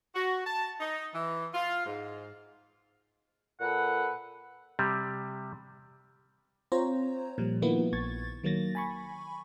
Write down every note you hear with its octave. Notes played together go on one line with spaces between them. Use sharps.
F#4
A5
D#4
E3
F4
G#2
A#2 A4 B4 F#5
C3 G3
C4 F4 C5 C#5 A#5
A#2 F3 G3
D#3 F3 A#3 B3 E4
A#1 C#6 G#6 A6
D#3 F#3 A#3 A6 A#6
G#5 B5 C#6